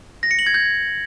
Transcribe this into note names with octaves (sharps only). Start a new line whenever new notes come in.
A#6
C#7
F#7
G#6
G6